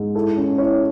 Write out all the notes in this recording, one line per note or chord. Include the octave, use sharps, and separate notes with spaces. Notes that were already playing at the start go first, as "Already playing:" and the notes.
Already playing: G#2
E4 A4
C#4
E4 C#5